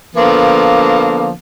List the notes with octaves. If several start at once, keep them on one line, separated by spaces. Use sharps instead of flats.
D3 F3 A#3 B3